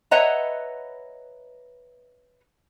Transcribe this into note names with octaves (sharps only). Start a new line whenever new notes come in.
B4 C#5 D#5 E5 F#5 A#5